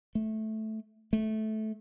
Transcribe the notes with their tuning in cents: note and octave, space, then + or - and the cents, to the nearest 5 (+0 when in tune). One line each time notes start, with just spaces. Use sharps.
A3 -10
A3 -15